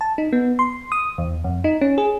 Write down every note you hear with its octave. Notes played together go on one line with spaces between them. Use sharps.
A5
D#4
B3
C6
D#6
E2
F2
D#4
C#4
G#4